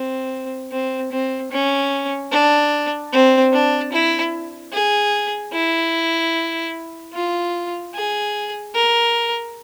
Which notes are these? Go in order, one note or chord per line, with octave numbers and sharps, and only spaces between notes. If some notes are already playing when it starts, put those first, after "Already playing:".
Already playing: C4
C4
C4
C#4
D4
C4
D4
E4
G#4
E4
F4
G#4
A#4